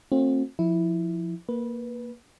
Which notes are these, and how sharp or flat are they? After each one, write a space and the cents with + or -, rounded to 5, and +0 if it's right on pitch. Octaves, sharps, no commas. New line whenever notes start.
A3 +40 C4 +35 F#4 -40
F3 +0 E4 -5
A#3 +0 B4 -15